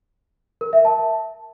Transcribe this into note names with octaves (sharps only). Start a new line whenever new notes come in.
A#4
E5
A5